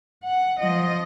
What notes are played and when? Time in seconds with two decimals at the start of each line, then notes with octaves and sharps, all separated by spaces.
0.23 F#5
0.60 F3 D#5